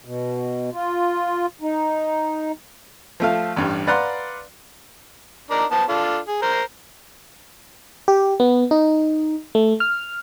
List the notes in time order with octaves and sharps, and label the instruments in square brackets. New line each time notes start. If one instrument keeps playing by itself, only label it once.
[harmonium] B2
F4
D#4
[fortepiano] F3 A3 F5
A1 G2 G3
B4 D5 F5 F#5 A#5 C6
[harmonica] D4 D#4 A#4
B3 C5 A5
D4 F4 A4
G#4
A#4 C5
[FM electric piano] G4
B3
D#4
A3
F6